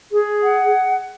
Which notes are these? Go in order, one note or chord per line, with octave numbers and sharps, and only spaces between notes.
G#4
F#5